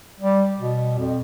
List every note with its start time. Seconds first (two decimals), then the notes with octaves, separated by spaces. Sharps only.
0.20 G3
0.59 B2
0.98 F2